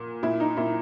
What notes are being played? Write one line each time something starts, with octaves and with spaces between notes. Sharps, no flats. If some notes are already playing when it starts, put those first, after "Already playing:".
Already playing: A#2
A#2 E4
D#4
A#2 E4